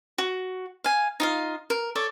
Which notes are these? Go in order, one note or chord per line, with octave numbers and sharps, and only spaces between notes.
F#4
F5 G#5
D#4 F4 F5
A#4
A4 C#5 D5